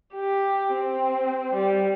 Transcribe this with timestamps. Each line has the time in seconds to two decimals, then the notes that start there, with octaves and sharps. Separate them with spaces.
0.14 G4
0.73 C4
1.54 G3